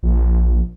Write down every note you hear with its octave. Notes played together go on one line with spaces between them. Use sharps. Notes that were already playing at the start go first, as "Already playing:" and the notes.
A#1